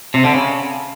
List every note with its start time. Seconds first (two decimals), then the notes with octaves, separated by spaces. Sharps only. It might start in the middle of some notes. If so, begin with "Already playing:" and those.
0.14 C3
0.24 D3
0.34 C#3